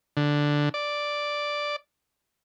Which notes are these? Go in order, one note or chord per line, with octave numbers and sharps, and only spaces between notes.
D3
D5